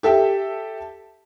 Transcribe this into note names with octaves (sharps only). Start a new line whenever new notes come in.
G4 A4 E5 G5